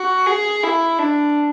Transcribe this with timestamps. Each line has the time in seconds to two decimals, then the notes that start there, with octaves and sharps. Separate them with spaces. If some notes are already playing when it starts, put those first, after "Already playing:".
Already playing: F#4
0.26 G#4
0.63 E4
0.99 D4